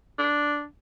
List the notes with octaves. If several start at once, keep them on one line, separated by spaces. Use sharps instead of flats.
D4